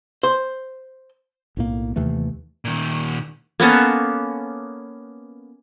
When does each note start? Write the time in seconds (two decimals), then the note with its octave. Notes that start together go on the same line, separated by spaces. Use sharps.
0.23 C5
1.57 B1 A2 F3 A#3
1.96 D#2 C3 E3 A3
2.65 A#2 D#3
3.60 A#3 B3 C#4 A4